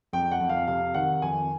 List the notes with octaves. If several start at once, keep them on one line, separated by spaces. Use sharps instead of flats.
F2 G5
F#5
F2
F5
C3 F5
D#3 F#5
F2 G#5